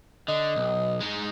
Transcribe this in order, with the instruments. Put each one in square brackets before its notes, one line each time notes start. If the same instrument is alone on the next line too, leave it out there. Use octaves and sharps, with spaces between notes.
[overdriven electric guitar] D3 [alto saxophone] D#5
[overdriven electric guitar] B1
G#3 D#4